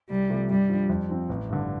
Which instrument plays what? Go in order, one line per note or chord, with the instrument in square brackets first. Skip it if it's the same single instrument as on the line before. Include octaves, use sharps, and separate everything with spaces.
[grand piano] C2 [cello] G3
[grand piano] C3 F3 A3
[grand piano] G2 [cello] G3
[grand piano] F3 D4
F2
F3 C4
A1
G2 D3